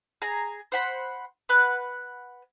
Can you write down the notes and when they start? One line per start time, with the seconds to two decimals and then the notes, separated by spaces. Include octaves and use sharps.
0.22 G#4 A#5
0.72 C5 F#5 B5
1.49 B4 F#5 F#6